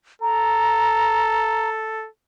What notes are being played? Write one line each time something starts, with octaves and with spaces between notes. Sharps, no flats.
A4 A#5